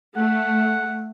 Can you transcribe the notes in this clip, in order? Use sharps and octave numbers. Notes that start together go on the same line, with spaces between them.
A3 F#5